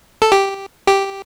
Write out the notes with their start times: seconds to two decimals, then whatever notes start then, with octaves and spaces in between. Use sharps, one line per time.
0.22 A4
0.32 G4
0.88 G4